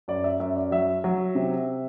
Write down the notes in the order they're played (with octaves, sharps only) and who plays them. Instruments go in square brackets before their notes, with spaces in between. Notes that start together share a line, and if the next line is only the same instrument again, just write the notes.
[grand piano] F#2 D5
E5
F#2 E5
D5
F#3 E5
F#3
C3